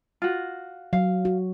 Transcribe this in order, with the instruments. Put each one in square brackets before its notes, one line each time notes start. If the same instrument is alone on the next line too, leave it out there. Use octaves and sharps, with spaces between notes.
[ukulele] F4 F#4
[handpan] F#3 [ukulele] F5
[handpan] F#4